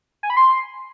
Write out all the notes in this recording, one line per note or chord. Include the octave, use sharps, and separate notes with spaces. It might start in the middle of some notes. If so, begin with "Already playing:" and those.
G#5
B5
C6